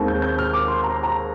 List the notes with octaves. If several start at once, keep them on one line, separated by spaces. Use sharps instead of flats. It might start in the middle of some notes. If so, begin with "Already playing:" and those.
Already playing: D#2 D#3 G#3 C4
G6
G6
F6
D6
C6
A#5
A#5